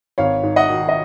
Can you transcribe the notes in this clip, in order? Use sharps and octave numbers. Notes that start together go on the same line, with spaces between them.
G#1 C#5 F5
G#2
D#5 F#5
D#3
D#5